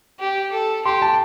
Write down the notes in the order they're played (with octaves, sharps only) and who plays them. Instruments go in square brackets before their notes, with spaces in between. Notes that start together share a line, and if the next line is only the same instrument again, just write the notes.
[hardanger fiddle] G4
A4
[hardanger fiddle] G4 [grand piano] C6
[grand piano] A5